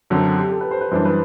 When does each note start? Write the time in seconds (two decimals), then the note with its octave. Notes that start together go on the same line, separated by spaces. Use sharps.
0.10 F#2 D3 F#3 C4 A4
0.38 G4
0.51 A4
0.61 B4
0.71 C5
0.81 B4
0.91 F#2 E3 G3 D4 C5
1.05 B4